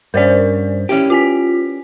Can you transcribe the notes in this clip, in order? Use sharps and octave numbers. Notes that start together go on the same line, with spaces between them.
G2 C#4 A#4 C5 D5
C#4 E4 G4
F4 G#5 B6